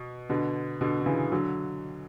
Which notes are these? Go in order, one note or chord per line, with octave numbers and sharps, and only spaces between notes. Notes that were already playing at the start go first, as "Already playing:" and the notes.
Already playing: B2
B2 D3
B2 D3
D3
C#3 E3
D3 F#3